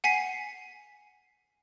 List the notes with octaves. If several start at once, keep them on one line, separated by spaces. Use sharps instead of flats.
F#5 G#5 B6 C7